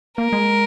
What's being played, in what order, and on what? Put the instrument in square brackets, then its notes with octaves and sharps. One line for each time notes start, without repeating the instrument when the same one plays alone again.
[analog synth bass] A#3 [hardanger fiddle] A#4
[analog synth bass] G#3